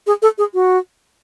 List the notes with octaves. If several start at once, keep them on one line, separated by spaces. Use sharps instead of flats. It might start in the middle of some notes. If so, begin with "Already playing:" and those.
G#4
A4
G#4
F#4